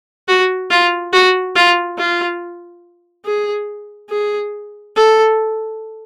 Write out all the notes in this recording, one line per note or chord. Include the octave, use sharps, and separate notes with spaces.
F#4
F4
F#4
F4
F4
G#4
G#4
A4